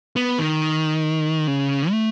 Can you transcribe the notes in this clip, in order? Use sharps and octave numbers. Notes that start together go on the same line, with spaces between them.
B3
D#3
C#3
A3